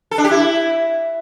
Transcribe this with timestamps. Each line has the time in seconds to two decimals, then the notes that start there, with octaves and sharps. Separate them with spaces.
0.11 A4
0.18 D4
0.24 G4
0.31 E4